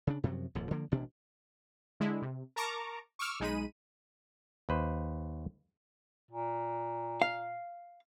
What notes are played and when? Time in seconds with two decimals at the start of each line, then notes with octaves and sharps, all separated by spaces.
0.07 C#3 D4
0.24 F#2 C3 F3 F#3
0.55 D#1 D#2 G#2 F3
0.71 D3 F3 A#3
0.92 A1 B2 D4
2.00 D3 G#3 E4
2.22 C3
2.56 A#4 A5 A#5 C#6 D6
3.19 C#6 D6 E6 F6
3.40 B1 G#3 D#4 B5 D#7
4.69 D#2 B4 C5
6.31 A#2
7.22 F5